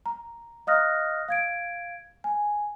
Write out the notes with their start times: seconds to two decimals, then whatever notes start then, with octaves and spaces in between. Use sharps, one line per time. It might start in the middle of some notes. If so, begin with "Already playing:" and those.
0.06 A#5
0.67 D#5 F5 D#6 F6 F#6 A#6
1.28 F5 G#6 D7
2.24 G#5